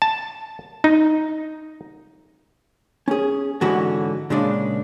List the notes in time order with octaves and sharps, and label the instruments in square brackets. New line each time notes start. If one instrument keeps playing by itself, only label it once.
[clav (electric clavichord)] A5
D#4
[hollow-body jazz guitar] C#4 G#4
G#2 D3 E3 C#4 F#4 B5
A#2 C#3 G#3 D4